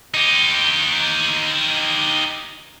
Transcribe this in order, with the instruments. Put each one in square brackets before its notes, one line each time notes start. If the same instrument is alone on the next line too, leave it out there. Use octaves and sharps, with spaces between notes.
[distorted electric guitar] D#4 G4